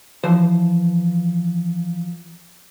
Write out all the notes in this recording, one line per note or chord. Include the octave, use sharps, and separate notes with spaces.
E3 F3 C5